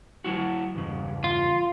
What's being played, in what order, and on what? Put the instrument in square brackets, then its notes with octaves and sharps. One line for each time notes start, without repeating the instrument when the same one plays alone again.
[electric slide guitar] F#3 E4 F#4
E2 G2 C#3
[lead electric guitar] F4